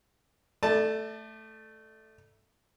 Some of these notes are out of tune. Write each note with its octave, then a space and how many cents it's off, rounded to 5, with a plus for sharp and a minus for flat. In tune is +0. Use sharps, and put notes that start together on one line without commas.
A3 +0 D5 +30 A5 +0